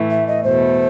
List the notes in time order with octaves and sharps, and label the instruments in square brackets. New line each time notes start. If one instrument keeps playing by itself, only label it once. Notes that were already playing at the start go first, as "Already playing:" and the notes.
Already playing: [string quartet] A2 E3 A3
[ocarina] E5
D#5
[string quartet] E2 B2 A3 [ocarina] C5